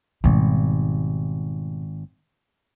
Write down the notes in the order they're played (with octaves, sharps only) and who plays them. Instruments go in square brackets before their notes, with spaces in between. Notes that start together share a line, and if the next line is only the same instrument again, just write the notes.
[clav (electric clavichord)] G#1 [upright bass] B2 G3